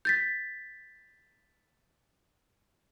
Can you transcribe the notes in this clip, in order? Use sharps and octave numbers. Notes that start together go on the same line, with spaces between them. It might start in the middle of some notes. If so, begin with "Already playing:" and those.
G6 A6 B6